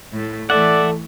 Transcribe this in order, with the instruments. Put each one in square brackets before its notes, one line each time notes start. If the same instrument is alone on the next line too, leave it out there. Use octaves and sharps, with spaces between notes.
[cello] A2 A3
[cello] E3 A3 [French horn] A4 [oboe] D5 [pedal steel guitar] E5 F#5